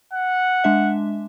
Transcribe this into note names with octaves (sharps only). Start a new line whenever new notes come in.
F#5
G#3 D4 E5